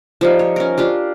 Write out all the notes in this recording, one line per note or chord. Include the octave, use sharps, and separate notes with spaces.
F3 G3 D#4
C#5
C#4 A#4
D4 F4 G4